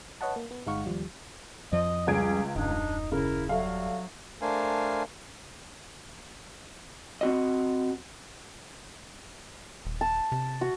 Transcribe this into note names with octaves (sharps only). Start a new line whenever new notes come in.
B4 C#5 D#5 F#5 A5
A#3
B3
G1 G#3 D#4 F5 F#5 C#6
D#2 F3 G3
F2 F3 D#5
C#2 G3 G#4 G#6 D7
D#1 F#2 D4 D#4
C#3 E4 A#4
F#3 G3 A4 E5 F5
A3 D4 A#4 C5 F5 G#5
C4 F#4 D#5
D#1
A5
C3
F#4